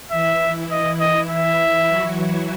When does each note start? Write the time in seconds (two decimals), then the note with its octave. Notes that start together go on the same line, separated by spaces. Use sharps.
0.11 E3 E4 E5
0.40 E3 E4
0.70 E3 E4 D#5
1.00 D#5
1.30 E5
1.88 F#3 F#4